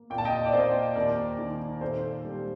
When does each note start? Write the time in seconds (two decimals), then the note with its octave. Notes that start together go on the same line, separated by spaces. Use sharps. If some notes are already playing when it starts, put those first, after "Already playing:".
Already playing: A#3
0.10 A#2 G5
0.18 A5
0.25 D#5 G5
0.46 D5
0.53 A#3 C5 D#5
0.96 D#2 A#4 D5
1.39 D#3
1.81 A#2 A4 C5
2.25 G3